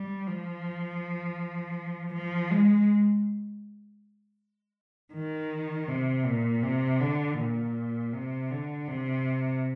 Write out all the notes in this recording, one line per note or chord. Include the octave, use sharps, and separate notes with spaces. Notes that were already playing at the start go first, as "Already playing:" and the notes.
Already playing: G3
F3
F3
G#3
D#3
C3
A#2
C3
D3
A#2
C3
D3
C3